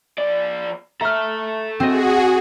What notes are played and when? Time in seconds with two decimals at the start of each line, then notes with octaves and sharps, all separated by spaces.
0.18 F3 D5
1.01 A4 E5 A#5 F6
1.80 C4 F#4 G#4 D#5